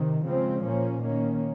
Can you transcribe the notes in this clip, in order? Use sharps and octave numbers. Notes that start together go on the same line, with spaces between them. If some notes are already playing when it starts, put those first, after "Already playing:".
Already playing: C3 D#3
C#3 F3 G#3 C4
A#2 F3 A#3 C#4
D#3 A#3 C#4